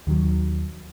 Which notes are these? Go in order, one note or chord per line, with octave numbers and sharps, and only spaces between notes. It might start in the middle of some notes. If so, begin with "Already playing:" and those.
D#2 D#3 F#3